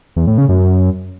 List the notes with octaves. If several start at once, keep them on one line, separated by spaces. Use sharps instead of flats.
E2
A2
C#3
F#2